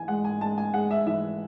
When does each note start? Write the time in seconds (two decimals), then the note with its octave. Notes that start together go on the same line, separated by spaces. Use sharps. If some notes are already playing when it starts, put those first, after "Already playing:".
Already playing: E3 G#5
0.08 G#3 F#5
0.25 G#5
0.41 G#3 A5
0.58 G#5
0.74 G#3 F#5
0.91 E5
1.06 E3 E5